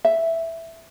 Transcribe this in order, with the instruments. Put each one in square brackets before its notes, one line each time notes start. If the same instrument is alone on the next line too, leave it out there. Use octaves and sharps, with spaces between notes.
[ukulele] E5